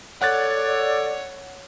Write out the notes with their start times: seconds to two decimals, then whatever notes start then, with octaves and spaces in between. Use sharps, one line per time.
0.22 A4 C#5 D5 F#5 F#6 A6